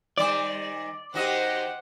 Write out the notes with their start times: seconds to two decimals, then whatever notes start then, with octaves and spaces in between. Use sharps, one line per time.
0.18 D#3 G3 C5 D5
1.14 D#3 F#4 G4 C5 D#5 F#5